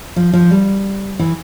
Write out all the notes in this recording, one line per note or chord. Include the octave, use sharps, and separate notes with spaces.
F3
F3
G3
E3